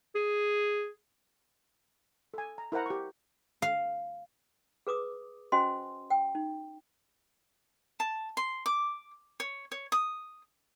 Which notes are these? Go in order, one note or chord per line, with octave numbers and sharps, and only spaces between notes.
G#4
A4 G#5
A#5
E4 A#4 C5 F#5 A#5
G4 C#6
F5
G#4 B4 D6 D#6
C#4 F#4 C5 D#5 G#5 C6
G5
D#4
A5
C6
D6
C#5
C#5
D#6